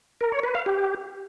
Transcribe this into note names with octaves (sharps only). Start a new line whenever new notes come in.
A#4
C#5
B4
F5
G4